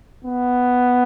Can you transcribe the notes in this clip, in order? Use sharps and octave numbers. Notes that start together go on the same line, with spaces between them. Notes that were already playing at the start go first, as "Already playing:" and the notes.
B3